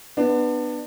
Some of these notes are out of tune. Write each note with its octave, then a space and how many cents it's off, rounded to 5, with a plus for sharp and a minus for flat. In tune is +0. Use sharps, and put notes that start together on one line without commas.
B3 +0 D4 +30